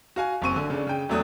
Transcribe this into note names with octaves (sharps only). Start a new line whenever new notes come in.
F#4 F5 G#5
F#1 C4 C#6 D#7
D3
C#3 D4
C#3 G5
E2 F#3 A3 D4 D#6